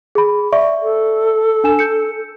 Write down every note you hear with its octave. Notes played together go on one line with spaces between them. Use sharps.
G#4 B5
D5 E5 C#6
A4
D4 G#5 E7
G6 C#7